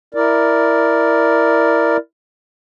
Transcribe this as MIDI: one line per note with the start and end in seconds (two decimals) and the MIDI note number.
0.14 1.97 64
0.14 1.97 70
0.14 1.97 74